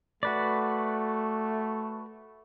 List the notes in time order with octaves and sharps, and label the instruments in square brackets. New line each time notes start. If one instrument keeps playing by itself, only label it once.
[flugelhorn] A3 [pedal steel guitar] F#4 B4 D5